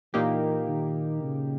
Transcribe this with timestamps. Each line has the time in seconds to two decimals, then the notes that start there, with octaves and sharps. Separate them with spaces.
0.13 A#2 E3 A#3 D#4 G4
0.68 D#3
1.22 C#3